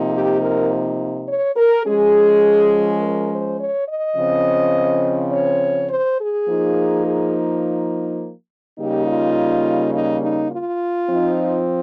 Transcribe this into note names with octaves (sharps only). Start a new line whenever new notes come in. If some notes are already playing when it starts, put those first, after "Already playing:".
Already playing: C3 F3 A#3 D#4
G4
A#4
C#5
A#4
F3 G#3 C#4 G#4
A#4
C5
C#5
D#5
C#3 F3 C4
C#5
C5
G#4
F3 A#3 D#4
G#4
C#3 G3 A#3 D#4 G4
F4
D#4
D#4
F4
F3 C4 D#4